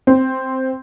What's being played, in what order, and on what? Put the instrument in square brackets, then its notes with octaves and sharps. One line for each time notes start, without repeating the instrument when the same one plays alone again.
[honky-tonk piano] C4